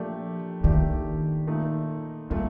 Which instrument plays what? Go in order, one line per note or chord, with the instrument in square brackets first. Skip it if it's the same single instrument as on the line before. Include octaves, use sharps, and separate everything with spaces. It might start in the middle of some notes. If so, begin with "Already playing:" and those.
Already playing: [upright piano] A#2 A3 D4 G4 [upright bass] F3
[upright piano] A#2 A3 D4 G4 [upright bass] D#3
[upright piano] A#2 A3 D#4
[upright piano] A#2 A3 [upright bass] G3